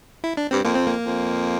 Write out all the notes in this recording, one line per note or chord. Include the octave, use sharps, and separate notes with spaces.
E4
D4
G2 C4
F2 A#3
C4
A#3
F2